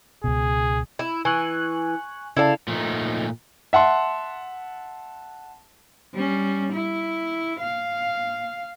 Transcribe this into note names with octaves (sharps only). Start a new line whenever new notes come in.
C#2 B2 G#4
E4
E3 G#5 C#6 F#6
C#3 E4 A4 D5 F5 A5
A#2 F3 A3 D#4
E5 F#5 A5 C6
G3 C#4
E4
F5